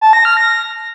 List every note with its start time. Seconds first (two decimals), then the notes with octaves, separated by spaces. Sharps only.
0.01 A5
0.13 A#6
0.25 F6
0.37 A#6